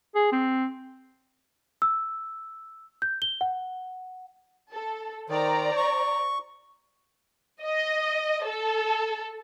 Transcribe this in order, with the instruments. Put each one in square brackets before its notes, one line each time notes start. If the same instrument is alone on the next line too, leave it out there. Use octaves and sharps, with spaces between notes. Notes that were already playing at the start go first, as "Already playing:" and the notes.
[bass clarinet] G#4
C4
[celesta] E6
G6
G7
F#5
[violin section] A4
[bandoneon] D#3 [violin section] C5 D5 A#5
[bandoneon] C#6
[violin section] D#5
A4